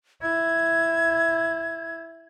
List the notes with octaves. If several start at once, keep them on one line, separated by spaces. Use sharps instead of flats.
E4 G#6